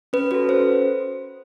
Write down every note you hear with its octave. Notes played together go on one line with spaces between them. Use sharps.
C#4 B4
F#4 A4 B4
C#4 C5